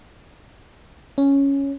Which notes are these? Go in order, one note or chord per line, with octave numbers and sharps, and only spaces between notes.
C#4